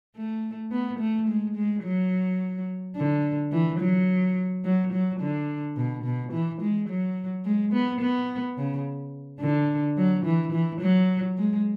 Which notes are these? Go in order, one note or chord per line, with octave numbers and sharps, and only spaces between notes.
A3
B3
A3
G#3
G#3
F#3
D3
E3
F#3
F#3
F#3
D3
B2
B2
E3
G#3
F#3
G#3
B3
B3
C#3
D3
F#3
E3
E3
F#3
G#3